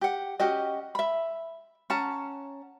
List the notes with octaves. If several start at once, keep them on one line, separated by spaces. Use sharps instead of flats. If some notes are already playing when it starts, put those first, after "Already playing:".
G4 F#5
C#4 F#4 G4 D#5
E5 B5
C#4 F#5 A5 A#5